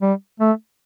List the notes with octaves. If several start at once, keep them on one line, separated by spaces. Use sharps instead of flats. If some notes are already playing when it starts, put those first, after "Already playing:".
G3
A3